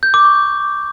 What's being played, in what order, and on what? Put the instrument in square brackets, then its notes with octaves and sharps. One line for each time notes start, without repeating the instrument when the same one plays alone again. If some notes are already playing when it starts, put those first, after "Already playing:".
[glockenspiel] G6
D6
C#6